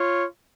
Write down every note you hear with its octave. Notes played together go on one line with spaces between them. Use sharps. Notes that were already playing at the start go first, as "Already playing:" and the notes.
Already playing: F4 C#5